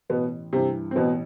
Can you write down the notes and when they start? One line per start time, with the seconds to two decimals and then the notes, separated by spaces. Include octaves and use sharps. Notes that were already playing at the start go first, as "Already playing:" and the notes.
0.09 A1 B2 B3
0.53 G2 C3 E3 C4
0.91 C4
0.96 A1 B2 B3